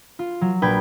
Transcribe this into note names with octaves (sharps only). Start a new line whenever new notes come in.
F4
F#3
A#1 B4 G5 G#6